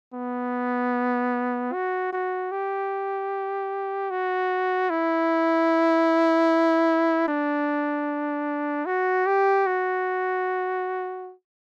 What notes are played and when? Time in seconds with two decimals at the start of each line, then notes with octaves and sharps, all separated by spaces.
0.14 B3
1.73 F#4
2.13 F#4
2.52 G4
4.11 F#4
4.90 E4
7.28 D4
8.86 F#4
9.27 G4
9.67 F#4